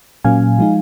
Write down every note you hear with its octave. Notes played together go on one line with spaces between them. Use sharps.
A#2 F#3 A#3 C#4 F5 G#5
F3 G#3 D#4